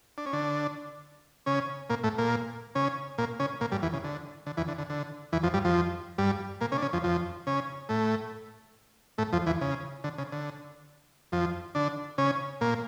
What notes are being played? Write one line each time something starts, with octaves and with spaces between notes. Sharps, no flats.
D4
C#4
D3 D4
C#3 C#4
A#2 A#3
A2 A3
A#2 A#3
C#3 C#4
A#2 A#3
C#3 C#4
A#2 A#3
G2 G3
E2 E3
C#3
D3
D3
E2 E3
D3
D3
D3
E2 E3
F2 F3
G2 G3
F2 F3
G2 G3
A#2 A#3
C#3 C#4
D4
C#3 C#4
F2 F3
F2 F3
C#3 C#4
A2 A3
A2 A3
F2 F3
E2 E3
C#3
D3
C#3
D3
F2 F3
D3 D4
C#3 C#4
A#2 A#3